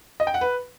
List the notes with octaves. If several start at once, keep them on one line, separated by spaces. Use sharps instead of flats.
D#5
G5
F#5
B4